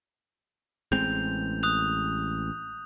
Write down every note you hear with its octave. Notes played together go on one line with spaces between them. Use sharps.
A1 G#3 C4 G6 F7
D#6 F#6 F7